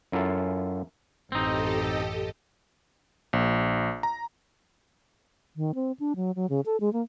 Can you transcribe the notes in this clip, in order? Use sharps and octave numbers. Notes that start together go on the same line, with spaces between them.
F#2 E4 F4 A4 F5
A1 F#2 C4 D#4 G4 A4 D#5
A#1
A#5
D#3
C4
D4
F#3
F#3
C#3
A4
G#3
A#3